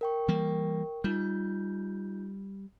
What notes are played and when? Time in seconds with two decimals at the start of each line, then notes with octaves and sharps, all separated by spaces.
0.01 A#4 G5 C#6
0.28 E3 G3 A#3
1.04 G3 D#4 F4 G6